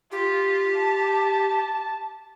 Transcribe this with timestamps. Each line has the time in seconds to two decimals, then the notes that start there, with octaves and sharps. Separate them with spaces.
0.12 F4 G4
0.75 A5